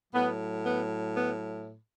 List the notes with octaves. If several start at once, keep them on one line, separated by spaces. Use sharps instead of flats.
A2 F#3 B3
B3
B3